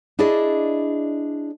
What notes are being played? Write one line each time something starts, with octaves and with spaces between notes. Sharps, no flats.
D4 E4 G#4 D5 D#5